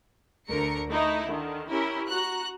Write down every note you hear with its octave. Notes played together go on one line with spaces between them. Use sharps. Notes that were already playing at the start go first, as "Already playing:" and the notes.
D2 D3 A3 A#4 A#5 C#7
A3 D#4 E4
D3 D#3
C#4 E4 G4 A#4
F#4 A#5 F#6